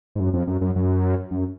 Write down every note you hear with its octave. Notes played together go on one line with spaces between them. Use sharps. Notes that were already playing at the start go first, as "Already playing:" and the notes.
G#2
F#2
F2
F#2
F#2
F#2
F#2